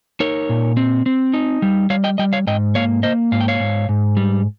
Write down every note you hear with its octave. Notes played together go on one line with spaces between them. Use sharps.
D#4 A#4 C#5
A#2
C4
C4
D#4
G3
G3 C#5 F5
D#5 G5
G3 D#5 G5
C#5 F5
G#2 D#5 G5
A#3 C#5 F5
A#3 C5 D#5
G#2 F5
G5
C#5 F5
G#2
G#2
G3